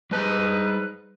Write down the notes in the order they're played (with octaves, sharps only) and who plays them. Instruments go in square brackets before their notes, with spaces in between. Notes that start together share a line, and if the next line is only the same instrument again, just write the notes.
[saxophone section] G#2 D#4 B4 [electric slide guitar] G3 A5